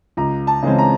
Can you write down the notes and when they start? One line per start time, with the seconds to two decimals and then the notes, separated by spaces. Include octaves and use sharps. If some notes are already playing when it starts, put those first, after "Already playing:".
0.17 C#2 A#5
0.47 A5
0.63 C#3 E3 G#3 C4
0.78 A#5